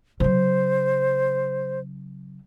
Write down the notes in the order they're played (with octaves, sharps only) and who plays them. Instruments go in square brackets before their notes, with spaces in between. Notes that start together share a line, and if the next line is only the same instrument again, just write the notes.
[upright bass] C#3 F#3 [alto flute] C5